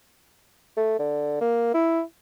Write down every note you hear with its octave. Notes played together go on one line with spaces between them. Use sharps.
A3
D3
A#3
E4